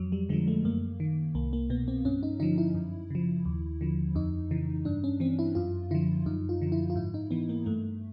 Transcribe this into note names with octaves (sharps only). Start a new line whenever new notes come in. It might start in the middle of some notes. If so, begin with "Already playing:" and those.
Already playing: F2 F#3
G3
D3 F3 G#3
A3
F#2 A#3
D#3
C2 A#3
A#3
B2 B3
C4
G2 C#4
D#4
D3 F3 D#4
E4
F#2
C#3 F3
D#2
D3 F3
F2 D#4
C#3 E3
G2 D4
C#4
E3 C4
E4
F#2 F4
D3 F3 E4
F#2 D#4
F4
D3 F3
E4
F4
G#2 E4
D#4
E3 B3
A#3
G2 A3